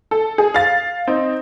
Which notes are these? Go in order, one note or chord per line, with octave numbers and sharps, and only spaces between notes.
A4
G#4
F5 A6
C4 D#4